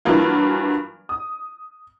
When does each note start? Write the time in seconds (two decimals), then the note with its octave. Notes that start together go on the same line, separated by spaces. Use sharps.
0.05 G2 E3 F#3 A#3 F4
1.09 D#6